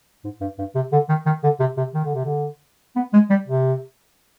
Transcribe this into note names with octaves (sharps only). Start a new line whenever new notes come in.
G#2
G2
G2
C3
D3
D#3
D#3
D3
C3
C3
D#3
D3
C3
D3
B3
G#3
G3
C3